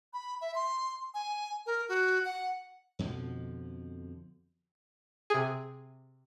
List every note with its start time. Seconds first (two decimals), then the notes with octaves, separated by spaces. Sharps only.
0.13 B5
0.41 E5
0.55 C6
1.14 G#5
1.66 A#4
1.89 F#4
2.25 F#5
2.99 F2 B2 D3 F3
5.30 C3 G#4